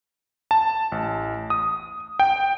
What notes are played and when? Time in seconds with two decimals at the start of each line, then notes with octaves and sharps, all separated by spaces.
0.51 A5
0.92 A1
1.50 D#6
2.20 G5